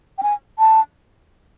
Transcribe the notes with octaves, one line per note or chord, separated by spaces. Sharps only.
G5
G#5
A5